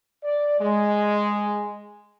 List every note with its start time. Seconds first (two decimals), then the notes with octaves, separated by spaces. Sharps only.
0.24 D5
0.61 G#3